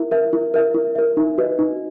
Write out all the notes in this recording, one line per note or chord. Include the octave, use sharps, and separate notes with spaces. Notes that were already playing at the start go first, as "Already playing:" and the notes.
Already playing: E4 A#4 E5
A#4 E5
E4
A#4 E5
E4
A#4 E5
D#4
F#4 B4 D#5
D#4